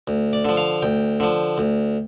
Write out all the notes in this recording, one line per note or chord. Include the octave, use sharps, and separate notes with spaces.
D2
D5
D3 F3
F5
D2 G5
D3 F3
D2